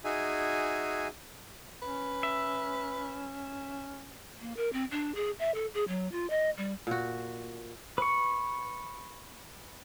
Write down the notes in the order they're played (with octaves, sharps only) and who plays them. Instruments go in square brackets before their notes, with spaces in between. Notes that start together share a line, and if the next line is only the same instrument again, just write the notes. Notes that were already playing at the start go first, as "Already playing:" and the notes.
[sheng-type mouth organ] D#4 F#4 G#4 E5 G#5
[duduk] C#4 [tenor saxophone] B4
[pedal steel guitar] E5
[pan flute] A#3
A#4
C4
D4
G#4
E5
A4
G#4
F#3
F4
D#5
G3
[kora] A#2 F#4
[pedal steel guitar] B4 C#6